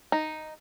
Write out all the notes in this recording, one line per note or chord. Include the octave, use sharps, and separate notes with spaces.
D#4